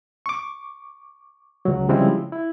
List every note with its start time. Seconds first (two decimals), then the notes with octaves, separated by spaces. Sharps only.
0.26 C#6 D6
1.65 C#2 F#3
1.89 C#3 F3 G3 G#3 C4 E4
2.32 E4